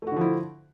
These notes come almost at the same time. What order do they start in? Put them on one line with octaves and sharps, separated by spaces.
A3 F#4 D3 F3 E4